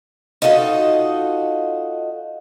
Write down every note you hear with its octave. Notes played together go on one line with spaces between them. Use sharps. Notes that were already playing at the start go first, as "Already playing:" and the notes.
D#4 F4 F#4 A4 D#5